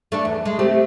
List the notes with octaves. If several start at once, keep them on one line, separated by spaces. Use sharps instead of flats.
A3 D4 A4
E2
G#3
A3 C4 G4